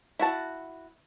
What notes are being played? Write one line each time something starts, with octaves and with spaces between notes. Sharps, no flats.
E4 F#4 A5